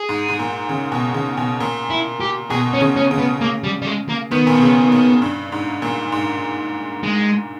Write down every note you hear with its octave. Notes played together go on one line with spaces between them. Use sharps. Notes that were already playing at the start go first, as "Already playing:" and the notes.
Already playing: G#4
G#2
G#2
A#2
C#3
B2
C#3
B2
A#2
E4
G4
B2 G#4
C#4
C#3
C#4
C#3
B3
A#3
G3
G3
G#3
A#3
D#3 B3
A#2
B2
C#3
A#2
G2
G#2
A#2
G#2
G#3